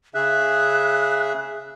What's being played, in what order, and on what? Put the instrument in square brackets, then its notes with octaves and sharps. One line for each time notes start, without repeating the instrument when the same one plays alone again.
[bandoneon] C#3 G#4 E5 [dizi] F#6